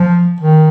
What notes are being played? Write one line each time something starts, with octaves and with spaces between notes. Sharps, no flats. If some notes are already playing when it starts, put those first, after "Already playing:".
Already playing: F3
D#3